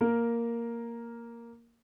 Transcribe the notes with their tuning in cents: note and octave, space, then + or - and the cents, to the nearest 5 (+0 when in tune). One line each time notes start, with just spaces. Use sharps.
A#3 +0 A#4 +0